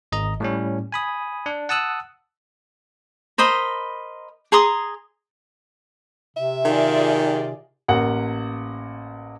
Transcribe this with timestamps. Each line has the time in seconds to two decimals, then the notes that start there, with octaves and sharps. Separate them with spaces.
0.12 G#1 D#5 A#5
0.40 A2 G3 C#4
0.92 G#5 B5 D#6
1.46 D4
1.69 F#5 A5 D#6 E6 F#6
3.38 A#4 C5 D#5 B5
4.52 G#4 A#5 C6 D#6
6.37 C3 E5
6.65 D#3 F4 G#4 D5
7.88 A1 A#3 F#5